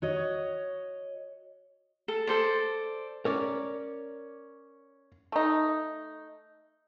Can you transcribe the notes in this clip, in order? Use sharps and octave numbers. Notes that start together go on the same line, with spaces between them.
F#4 C#5 D#5
A4
A4 C5 D5
C#4 A#4 C#5 D5
A3 D#4